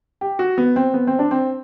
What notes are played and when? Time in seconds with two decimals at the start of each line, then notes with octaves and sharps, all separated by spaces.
0.21 G4
0.39 F#4
0.58 B3
0.76 C4
0.94 B3
1.07 C4
1.19 D4
1.31 C4